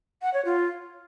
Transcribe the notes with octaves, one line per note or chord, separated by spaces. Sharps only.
F#5
C#5
F4